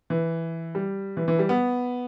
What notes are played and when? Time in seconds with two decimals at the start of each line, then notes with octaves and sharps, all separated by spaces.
0.10 E3
0.75 G3
1.17 E3
1.28 E3
1.39 G3
1.49 B3